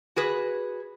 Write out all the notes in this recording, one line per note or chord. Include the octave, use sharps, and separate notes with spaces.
F#4 G#4 B4